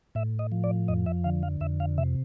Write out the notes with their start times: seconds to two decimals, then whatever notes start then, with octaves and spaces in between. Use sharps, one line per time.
0.15 A2 E5
0.39 D#5
0.52 F3
0.64 D5
0.88 F2 D#5
1.06 E5
1.24 D3 F5
1.43 F5
1.61 F2 E5
1.80 F5
1.98 C3 E5